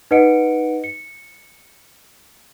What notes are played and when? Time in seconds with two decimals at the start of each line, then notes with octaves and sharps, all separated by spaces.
0.11 D#4 B4 D#5 F#5 C#7 D7
0.84 C#7